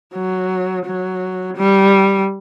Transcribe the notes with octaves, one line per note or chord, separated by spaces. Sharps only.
F#3
F#3
G3